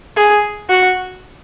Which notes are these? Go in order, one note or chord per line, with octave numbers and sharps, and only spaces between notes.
G#4
F#4